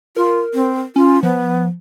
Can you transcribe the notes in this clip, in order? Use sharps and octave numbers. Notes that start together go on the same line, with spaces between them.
F4 A#4
C4
C#4 F4
F3 B3